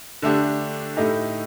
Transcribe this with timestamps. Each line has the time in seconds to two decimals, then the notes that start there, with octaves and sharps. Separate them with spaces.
0.22 D3 A3 D4 G4
0.97 A2 A3 D#4 G4